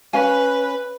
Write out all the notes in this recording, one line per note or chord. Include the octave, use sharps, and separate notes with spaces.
C#4 B4 F5 G#5